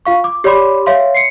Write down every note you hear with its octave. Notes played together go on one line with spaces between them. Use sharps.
F4 F5 C#6
D6
G4 C#5 D5 B5 C6 D6
C#5 E5 F5 C6
C7 C#7